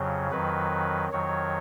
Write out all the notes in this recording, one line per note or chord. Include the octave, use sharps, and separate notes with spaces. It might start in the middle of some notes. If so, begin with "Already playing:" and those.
Already playing: F2 C#3 F#3
F2 D#3 F#3 B4
F2 D#3 F#3 C#5